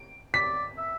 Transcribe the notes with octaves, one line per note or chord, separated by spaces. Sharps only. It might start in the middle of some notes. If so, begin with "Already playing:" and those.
Already playing: D7
D5 B6
E5